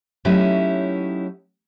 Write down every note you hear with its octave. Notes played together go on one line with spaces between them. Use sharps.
F#3 A3 C#4 D#4 E4 G4